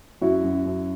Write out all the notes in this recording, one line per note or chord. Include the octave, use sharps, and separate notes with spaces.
F#2 E4 F#4
F#2
F#2